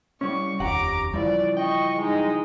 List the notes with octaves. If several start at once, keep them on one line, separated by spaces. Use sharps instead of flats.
C2 G3 C#4 C#6
F1 D#2 G4 F#5 A#5 D6
C#3 E3 F3 G3 D5
D#5 G5 C#6
G#3 D#4